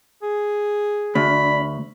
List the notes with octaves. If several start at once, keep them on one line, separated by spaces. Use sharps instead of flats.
G#4
D2 D4 B5